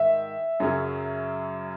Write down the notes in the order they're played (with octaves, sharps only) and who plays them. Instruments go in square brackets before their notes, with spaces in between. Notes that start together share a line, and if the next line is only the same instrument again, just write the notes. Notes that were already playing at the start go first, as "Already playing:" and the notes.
Already playing: [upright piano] G#2 D#3 G#3 [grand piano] E5
[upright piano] F#2 C#3 F#3 C#4 G#4